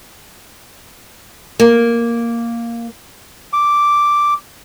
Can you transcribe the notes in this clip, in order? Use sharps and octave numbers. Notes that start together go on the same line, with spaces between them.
A#3
D6